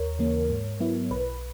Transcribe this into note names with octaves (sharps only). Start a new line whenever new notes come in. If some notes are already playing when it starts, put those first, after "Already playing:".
Already playing: D#2 A#4 C#5
C#3 E3 A#3
G#2
F#3 B3 E4
B1 B4